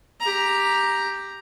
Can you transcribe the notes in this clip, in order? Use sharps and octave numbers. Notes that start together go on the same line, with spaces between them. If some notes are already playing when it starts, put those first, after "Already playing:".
G4 A#5